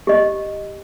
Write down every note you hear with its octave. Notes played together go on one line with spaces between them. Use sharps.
G4 D#5